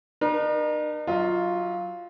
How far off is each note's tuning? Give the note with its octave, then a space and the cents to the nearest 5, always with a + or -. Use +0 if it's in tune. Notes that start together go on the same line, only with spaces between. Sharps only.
D#4 -45 A#4 +35
F#3 +0 F4 +0 D#5 +35